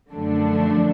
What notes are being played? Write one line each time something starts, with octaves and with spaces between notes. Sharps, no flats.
F#2 D3 F3 A3 D4